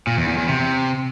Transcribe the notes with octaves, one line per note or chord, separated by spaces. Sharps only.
A#2
E2
E2
E2
C3